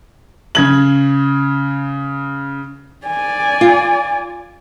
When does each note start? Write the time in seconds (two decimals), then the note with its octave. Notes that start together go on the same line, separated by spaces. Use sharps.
0.55 C#3 G#6 F#7
3.07 D5 G#5
3.61 F4